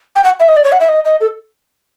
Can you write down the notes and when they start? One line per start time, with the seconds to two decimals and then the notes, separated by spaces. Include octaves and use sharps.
0.16 G5
0.24 F#5
0.40 E5
0.48 D#5
0.56 D5
0.64 C#5
0.72 F#5
0.80 E5
0.89 D#5
1.05 D#5
1.21 A4